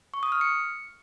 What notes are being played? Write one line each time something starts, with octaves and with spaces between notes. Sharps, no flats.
C#6
D#6
F6
C#7